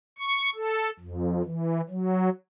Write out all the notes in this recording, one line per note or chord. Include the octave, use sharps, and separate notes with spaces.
C#6
A4
F2
E3
F#3